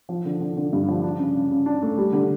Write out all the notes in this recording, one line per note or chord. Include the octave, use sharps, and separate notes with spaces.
F3
D3
D3
D3
G2
F3
D4
C#3
C#3
C#3
D4
A3
G3
D3